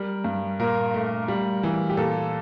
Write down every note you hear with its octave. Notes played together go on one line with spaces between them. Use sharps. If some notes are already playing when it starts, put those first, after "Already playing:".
Already playing: G3 A#4
G2
A#2 A#4
A3
G3
E3
G4
A#2 A4